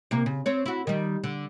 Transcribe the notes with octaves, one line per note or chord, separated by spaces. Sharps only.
C3 A#3
C#3
C4 C#5
E4 F#4
D#3 G3
D3